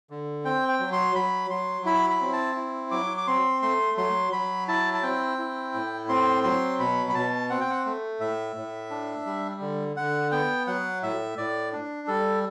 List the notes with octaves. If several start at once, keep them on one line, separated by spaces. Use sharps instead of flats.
D3
C4 G5
G5
F#3
C6
F#3 B5
F#3 C6
E4 B5
B5
C4
A5
E4
F#3 D6
D6
C4 C6
A3 C6
F#3 C6
F#3 B5
E4 A5
A5
C4 G5
E4
A2
C4 C6
F#3 C6
B2 B5
B5
B2 A5
C4 F#5
G5
F#5
A3
A2 E5
A2
D4
G3
D3
D3 F#5
B3 G5
F#3 F#5
A2 E5
A2 D5
D4
G3 A4